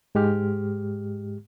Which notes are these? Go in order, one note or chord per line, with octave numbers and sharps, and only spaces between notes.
G#2 G#3 G4 F6